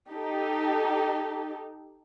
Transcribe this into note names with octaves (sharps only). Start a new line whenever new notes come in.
D#4 G4 A4